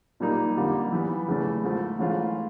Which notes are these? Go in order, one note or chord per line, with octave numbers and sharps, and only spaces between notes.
A#2 G3 A#3 D#4
F2 D3 G3 A#3
E3 G3 B3
E2 C#3 E3 A3
G#2 F3 A3
G#2 E3 A3 C#4 F4